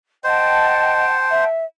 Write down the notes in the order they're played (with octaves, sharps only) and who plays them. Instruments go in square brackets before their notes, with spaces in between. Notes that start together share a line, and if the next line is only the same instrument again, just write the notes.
[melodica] C5 [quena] D#5 [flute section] F#5 G5 A5
[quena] E5